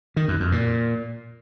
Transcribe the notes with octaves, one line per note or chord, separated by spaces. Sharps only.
D#3
F#2
F2
A#2